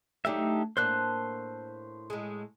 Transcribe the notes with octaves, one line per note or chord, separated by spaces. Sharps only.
F#3 A3 D4 D#4 G4 E5
A2 A#3 D4 C5 F#6
A2 G#3